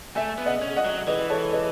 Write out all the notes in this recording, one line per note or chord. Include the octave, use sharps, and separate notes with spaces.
A3 E5 G#5
B3
D#5 F#5
C#4
D#5 F#5
F#3
E3 B4 D#5
A4 C#5
B4 D#5